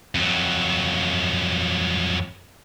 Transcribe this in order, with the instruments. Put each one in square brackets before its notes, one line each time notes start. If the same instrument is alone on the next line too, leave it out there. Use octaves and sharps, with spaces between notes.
[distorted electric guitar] F2 F#3